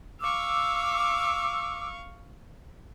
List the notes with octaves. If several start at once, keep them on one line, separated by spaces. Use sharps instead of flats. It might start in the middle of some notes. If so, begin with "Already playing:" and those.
F5 C#6 D6 E6